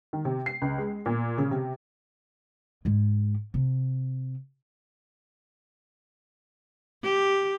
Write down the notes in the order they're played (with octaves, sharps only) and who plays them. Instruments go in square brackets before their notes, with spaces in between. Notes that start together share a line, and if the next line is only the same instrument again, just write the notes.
[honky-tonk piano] D#3
C3
C7
C#2
G#3
A#2
C#3
C3
[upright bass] G#2 G#3
C3
[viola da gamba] G4